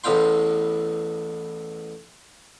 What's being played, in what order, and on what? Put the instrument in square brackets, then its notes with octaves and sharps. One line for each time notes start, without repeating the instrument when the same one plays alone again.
[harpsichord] A1 E2 A2 F5 G5 C6